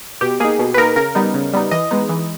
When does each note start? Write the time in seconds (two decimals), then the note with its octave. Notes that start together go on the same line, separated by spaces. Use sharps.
0.21 B2 G4
0.40 A#3 D#4 G#4
0.59 B2
0.74 B4
0.77 A#3 D#4 A#4
0.96 C#3 A#4
1.15 G3 B3 D#4
1.34 C#3
1.53 G3 B3 D#4
1.71 E3 D#5
1.91 G#3 B3 D#4
2.09 E3